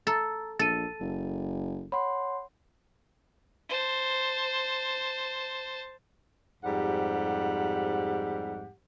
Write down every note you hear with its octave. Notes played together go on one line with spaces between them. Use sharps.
A4 A#5 E6 A6
A#1 A4 A6 D#7
F#1
C#5 F#5 B5 C6
C5 A5
F2 G#2 G3 G4 F#5